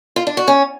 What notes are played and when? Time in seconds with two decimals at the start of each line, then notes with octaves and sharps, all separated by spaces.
0.16 F4
0.27 D4
0.37 F#4
0.48 C#4